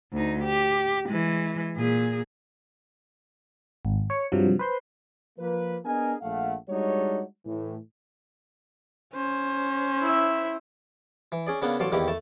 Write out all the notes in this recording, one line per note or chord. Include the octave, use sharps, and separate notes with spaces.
D2 D#4
G4
E3 G#3
A#2 G#4
G#1
C#5 C#7
G2 C3 F3 F#3
B4 C5 C6
F3 A#3 B4
B3 D4 G#4 A#4 D#5 G#5
A#1 A3 F5 F#5
G3 G#3 D4 D#4 F#4 C#5
A2 E3
C#4 C5
E4 E5
E3
C#4 G#4 D5
C#3 A#3 B3 C#4 D4
A1 F#3 D5 F5 A5 C6
E2 D#3 A#3 E4 G4
A3 A5